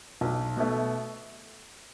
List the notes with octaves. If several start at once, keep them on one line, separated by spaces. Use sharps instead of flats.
B1
B2 A3